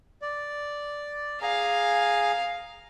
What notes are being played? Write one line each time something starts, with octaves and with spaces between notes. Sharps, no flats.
D5
G#4 F5 G#5 A#5